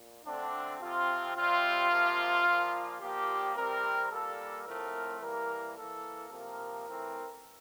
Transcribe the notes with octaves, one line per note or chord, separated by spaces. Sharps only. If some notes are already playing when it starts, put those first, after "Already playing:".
Already playing: A#2
D3 A3 C4 D4
C3 F3 C4 F4
C3 G3 C4 F4
C3 F3 A#3
A#2 F3 A#3
A#2 F3 A#3 G4
C3 G3 C4 A#4
A#2 G3 A#3 A4
A2 F3 A3 C4 A#4
E3 G3 A#3 A#4
E3 A#3 A4
C3 F3 A#3 A#4
E3 A3 C4